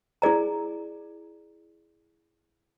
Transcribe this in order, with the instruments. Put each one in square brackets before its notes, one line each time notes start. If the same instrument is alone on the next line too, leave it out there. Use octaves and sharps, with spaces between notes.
[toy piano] E4 G#4 D5 A#5